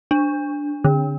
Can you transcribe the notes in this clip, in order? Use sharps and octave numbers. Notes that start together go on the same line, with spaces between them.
D4
D3